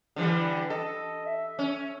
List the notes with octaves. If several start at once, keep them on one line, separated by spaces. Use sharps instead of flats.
D3 E3 G3
A4 D#5
E5
C#4